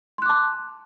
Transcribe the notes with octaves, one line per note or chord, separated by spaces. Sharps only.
A5 C6 D6 F#6